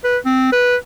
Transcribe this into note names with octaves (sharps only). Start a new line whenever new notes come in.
B4
C4
B4